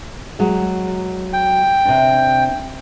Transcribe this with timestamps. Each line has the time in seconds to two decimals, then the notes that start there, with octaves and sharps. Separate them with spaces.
0.39 F#3 G#3
1.33 G5
1.85 C3 C4 D4